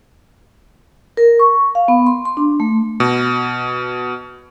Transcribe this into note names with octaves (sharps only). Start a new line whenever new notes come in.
A#4
C#6
F5
B3
C6
C6
D4
A3
B2